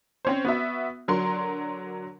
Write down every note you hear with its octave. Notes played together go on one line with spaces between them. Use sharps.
C4 C#4 C5
B3 F#4 E5
D3 F#3 A#4 C6